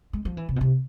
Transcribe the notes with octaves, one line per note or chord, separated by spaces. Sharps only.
G#3
F3
E3
C3
B2
C3